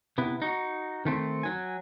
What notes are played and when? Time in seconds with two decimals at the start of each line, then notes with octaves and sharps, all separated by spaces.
0.18 C3 B3 E4
0.42 D#4 F#4
1.05 D#3 A3 C4
1.43 F#3 G#5